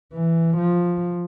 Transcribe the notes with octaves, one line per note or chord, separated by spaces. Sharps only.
E3
F3